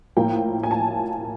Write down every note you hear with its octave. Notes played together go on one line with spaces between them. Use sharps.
A2 F3 A#3 G5
G#5
A5